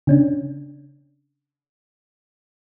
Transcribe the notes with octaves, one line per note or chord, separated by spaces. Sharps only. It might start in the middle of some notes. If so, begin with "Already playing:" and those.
C#3 C#4 D4